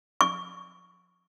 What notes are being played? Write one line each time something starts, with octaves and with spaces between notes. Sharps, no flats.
C#6